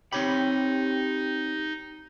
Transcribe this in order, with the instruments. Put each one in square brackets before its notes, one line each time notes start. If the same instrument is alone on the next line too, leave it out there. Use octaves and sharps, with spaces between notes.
[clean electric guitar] C4 C#5 B5 [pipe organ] D#4 [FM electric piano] G4